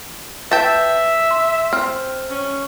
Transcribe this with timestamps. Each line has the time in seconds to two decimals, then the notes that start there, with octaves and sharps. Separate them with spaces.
0.51 B4 E5 G5 A5
1.31 C6
1.73 C4 F6
2.31 C#4